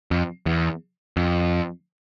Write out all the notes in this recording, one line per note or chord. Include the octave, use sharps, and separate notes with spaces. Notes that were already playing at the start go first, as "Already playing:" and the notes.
F2
E2
F2